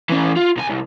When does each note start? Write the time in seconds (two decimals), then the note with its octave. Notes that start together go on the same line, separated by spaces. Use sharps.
0.10 E3 C#4
0.37 F4
0.57 C2 G#5
0.70 C2